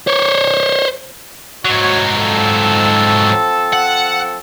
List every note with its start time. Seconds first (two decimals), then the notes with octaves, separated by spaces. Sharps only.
0.07 C5 C#5
1.65 G#2 F#3 F#4 C#5
2.16 F3 C4 A4
3.73 F#5